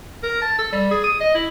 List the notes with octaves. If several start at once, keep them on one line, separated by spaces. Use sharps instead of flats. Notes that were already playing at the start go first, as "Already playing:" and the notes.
A#4
A5
A4
G3
G#4
D#6
D#5
E4